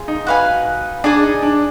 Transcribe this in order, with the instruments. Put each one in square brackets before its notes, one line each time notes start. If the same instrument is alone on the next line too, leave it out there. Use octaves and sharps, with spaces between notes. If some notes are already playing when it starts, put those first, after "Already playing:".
Already playing: [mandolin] F4 G#4
[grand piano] D#4
[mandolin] F#4 B4 F5 G#5
[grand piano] D4 [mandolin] G#4 D5 G#5
[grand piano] D#4
D4